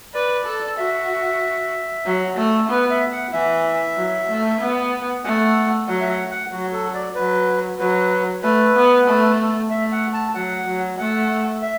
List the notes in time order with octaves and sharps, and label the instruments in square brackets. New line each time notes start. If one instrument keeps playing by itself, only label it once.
[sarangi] B4 [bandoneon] D5
[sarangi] A4
[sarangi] F#4 [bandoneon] E5
[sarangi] F#3
A3
[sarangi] B3 [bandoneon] B4
[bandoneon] E5
F#5
[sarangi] E3 [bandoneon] E5
[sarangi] F#3
A3
B3
[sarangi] A3 [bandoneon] F#5
[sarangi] F#3 [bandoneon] F#5
[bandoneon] E5
F#5
F#5
[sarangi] F#3 [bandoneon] F#4
[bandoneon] A4
D5
[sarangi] F#3 [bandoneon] B4
[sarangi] F#3 [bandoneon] B4
[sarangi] A3 [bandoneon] B4
[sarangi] B3
A3
[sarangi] A3 [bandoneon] E5
[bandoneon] F#5
A5
[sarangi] F#3 [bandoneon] F#5
[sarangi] F#3
[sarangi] A3 [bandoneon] F#5
[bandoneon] E5